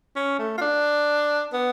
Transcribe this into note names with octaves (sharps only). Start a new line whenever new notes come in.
C#4
A3
F4
D4
B3